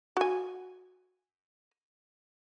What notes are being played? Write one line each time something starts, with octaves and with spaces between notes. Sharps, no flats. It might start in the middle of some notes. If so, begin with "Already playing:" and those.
F#4 G#5